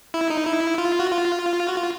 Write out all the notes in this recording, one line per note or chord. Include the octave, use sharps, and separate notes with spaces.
E4
D#4
E4
F4
F#4
F4
F#4
F4